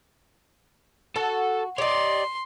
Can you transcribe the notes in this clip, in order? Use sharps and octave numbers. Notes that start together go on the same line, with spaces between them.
F#4 A4 A5
D#4 G4 C#5 D5 C6